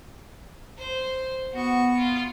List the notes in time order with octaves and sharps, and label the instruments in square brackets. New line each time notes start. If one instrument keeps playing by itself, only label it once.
[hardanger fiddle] C5
[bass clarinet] B3 [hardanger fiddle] F#4 C#6
[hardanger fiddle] F4